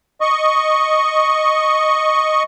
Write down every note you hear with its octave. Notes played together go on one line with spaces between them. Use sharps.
D#5 C#6